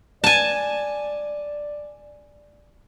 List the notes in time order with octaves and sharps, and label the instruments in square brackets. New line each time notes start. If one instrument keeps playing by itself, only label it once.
[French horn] D5 [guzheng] G#5 A5